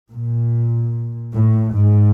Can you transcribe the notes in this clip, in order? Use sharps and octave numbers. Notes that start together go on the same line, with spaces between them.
A#2
A2
G#2